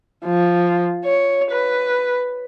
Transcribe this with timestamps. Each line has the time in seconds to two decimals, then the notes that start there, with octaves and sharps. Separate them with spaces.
0.25 F3
1.05 C#5
1.51 B4